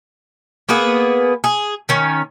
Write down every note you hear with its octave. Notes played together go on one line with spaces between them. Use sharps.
A#3 B3 G#4 B4
G#4
D#3 C#4